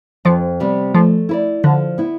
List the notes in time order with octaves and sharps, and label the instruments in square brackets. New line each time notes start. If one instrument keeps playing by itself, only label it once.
[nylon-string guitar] F2 [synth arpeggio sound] F3
[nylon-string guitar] C3 G3 B3
[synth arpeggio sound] F3 [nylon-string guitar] A3
[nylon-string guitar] E4 B4 D5
[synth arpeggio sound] D3 [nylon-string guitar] F3
[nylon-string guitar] B3 E4